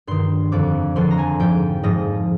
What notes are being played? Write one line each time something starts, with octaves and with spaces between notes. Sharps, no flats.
G2 D#3 C6
F2 D3 F3 D6
F2 D3 F3 C6
A#5
G#5
G#2 F3 G5
G#2 F3 D#5